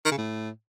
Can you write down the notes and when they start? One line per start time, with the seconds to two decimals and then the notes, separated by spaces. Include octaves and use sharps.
0.05 D#3
0.12 C#3
0.18 A2